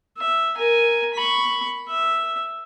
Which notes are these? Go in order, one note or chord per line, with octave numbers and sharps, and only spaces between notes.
E5
A#4 G#5
B5 C#6
E5